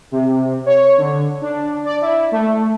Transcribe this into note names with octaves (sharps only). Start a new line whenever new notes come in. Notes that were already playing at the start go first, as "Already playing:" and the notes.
C3
C#5
D3
D4
D5
E4
A3